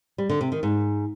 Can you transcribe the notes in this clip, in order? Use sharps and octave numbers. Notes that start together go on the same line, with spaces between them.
G3
D3
C3
D#3
G#2